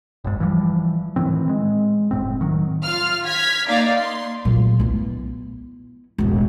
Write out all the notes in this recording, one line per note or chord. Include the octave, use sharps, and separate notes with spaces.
F#1 G#2
E3 F3 G3
A2 D#3 E3 C4
G#3
F1 A2 C4
D#3 F#3
F4 F5 F6
F6 G#6 B6
A#3 D#4 D5 F5 A#5
C6
A#2 F#3
B3 E4
E1 A1